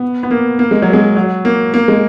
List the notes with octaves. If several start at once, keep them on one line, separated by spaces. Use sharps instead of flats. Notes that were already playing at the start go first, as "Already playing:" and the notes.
Already playing: B3
B3
A#3
A#3
G#3
F#3
G#3
F#3
A#3
A#3
G#3